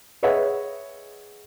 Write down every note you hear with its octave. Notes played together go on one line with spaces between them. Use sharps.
G#4 B4 C#5 D#5 E5 F#5